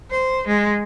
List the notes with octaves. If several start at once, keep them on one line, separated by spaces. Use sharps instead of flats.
C5
G#3